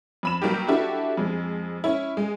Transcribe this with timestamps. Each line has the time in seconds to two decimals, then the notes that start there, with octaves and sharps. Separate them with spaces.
0.23 F2 B5 E7
0.42 F#3 G3 A#3 D#4 G4
0.68 D4 E4 F#4 G4 A4
1.17 F2 G#3
1.84 C#4 E4
2.17 G#3